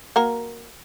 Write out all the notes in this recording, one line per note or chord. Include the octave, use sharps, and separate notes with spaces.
A#3 F#4 A#4